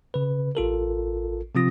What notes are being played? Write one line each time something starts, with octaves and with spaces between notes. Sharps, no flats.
C#3 B4
A1 F4 A4 A#4
C3 F3 C4 F4 D#6 A#6